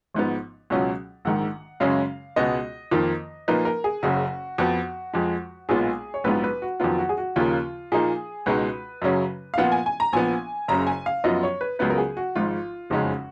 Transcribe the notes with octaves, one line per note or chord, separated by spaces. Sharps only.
G#1 G#2 F3 B3
C#2 B2 F#3 C#4 F4
A#1 G#2 D#3 F#5
F#2 C#3 G#3 C#4 F5
C#2 B2 G#3 B3 D#5
F2 D#3 A#3 F4
A#2 F3 A#3 D#4 B4
A#4
G#4
F#1 F#2 C#3 F#4
F2 F3 B3 F#4
F2 F3 G#3
B1 A#2 G#3 B3 F4 G#4
C#5
A#1 G#2 F#3 B3 F4 B4
B4
F#4
F2 D#3 F#3 B3 F4
F#4
G#4
F#4
D#2 C#3 F3 A#3 F4
A#2 F3 A#3 D#4 G#4
C#2 B2 G#3 D#4 B4
F#2 C#3 F#3 C#4
F5
A#2 F3 B3 F4 F#5
G#5
G#5
A#5
A#1 A#2 F3 B3 G#5
F#1 F#2 C#3 A#5
G#5
F5
F#2 F3 B3 F4 D#5
C#5
B4
C#2 C#3 F#3 B3 F4 B4
A#4
G#4
F#4
G#1 G#2 F3 F4
F#1 F2 C#3 G#3 D#4 F#4